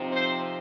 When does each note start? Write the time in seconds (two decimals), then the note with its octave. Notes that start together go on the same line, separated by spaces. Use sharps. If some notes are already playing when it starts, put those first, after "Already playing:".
Already playing: C3 F3 C4 D#4
0.11 C5